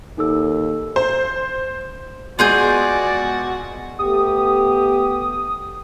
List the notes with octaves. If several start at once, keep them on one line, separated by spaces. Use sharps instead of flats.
D#2 D#4 A4 E6
C5
B2 G#3 F4 F#4 G#4 D5 G#5 G6
A3 B3 G4 D#6